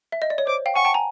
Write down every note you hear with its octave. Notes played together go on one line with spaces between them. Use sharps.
E5
D#5
D5
C#5
C5 D6
F5 G5
F#5 G#5 C#6
G5 A5
G#5 A#5